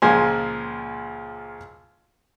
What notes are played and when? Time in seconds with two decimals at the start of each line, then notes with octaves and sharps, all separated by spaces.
0.02 C#2 A#2 F3 G#3 G#5 C6